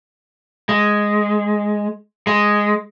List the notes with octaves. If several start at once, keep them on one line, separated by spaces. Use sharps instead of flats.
G#3
G#3